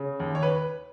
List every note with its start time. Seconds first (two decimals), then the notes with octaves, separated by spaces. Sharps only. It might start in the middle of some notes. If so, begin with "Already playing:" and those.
Already playing: C#3
0.20 D#2
0.35 C#5
0.43 B4